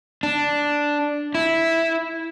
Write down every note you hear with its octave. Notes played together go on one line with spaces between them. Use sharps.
D4
E4